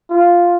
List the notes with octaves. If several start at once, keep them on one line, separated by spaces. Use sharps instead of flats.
F4